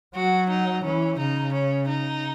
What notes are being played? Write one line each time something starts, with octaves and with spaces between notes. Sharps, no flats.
F#3 F#4
D#4
E3 C#4
C#3 D#4
C#4
D#4